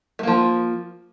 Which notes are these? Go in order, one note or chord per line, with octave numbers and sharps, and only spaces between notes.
F3 A3 A#3